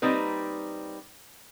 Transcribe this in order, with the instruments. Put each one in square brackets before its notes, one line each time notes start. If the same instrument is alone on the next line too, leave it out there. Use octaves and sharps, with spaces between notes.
[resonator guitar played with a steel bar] G3 A#3 C4 D#4 B4